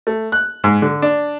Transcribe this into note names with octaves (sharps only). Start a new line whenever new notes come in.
A3
F#6
G#2
D3
D4